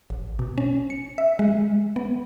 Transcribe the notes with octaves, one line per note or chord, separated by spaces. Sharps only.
A1
B2
C#4
C#7
E5
G#3
B3